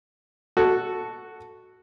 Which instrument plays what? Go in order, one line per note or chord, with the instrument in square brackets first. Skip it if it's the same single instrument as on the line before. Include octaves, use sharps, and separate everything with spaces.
[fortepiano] F#4 A4